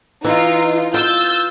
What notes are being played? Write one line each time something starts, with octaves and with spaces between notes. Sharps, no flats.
E3 D#4 F4
F4 E6 G6 A6